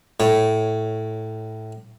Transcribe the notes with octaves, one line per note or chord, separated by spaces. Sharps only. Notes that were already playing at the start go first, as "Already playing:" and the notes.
A2 C#5